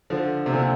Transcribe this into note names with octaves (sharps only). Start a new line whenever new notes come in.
D3 F3
C3
A#2 D3